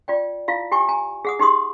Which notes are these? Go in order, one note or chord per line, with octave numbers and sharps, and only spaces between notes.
F4 D5 G5
E4 F4 F5
E4 G4 G5 G#5 C#6
G#5 A#5
G#4 F#5 D#6
D#4 G4 G#4 C6 D#6